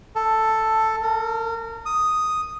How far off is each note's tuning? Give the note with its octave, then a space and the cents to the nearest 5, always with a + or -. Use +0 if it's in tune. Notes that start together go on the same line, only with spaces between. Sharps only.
A4 +5
A#4 -30
D#6 +0